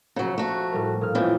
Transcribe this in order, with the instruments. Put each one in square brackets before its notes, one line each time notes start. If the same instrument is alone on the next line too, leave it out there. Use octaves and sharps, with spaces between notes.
[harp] A#1 A#5 C#7 [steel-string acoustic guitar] C#3 F#3
[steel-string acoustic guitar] A3 F#4
[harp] A2 G3 A#4
A#2 D#4 F6
[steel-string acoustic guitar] F2 A2 E3